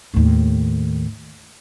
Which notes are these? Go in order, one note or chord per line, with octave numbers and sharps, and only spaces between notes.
D#2 A2